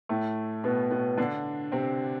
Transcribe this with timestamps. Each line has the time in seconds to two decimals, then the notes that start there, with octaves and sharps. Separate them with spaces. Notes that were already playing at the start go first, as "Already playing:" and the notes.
0.09 A2 A3
0.64 B2 B3
0.91 B2 B3
1.17 D3 D4
1.72 C3 C4